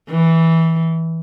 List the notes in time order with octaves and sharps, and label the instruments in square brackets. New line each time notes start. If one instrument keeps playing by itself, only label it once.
[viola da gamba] E3